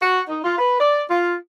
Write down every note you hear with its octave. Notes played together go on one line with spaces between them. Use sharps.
F#4
D#4
F4
B4
D5
F4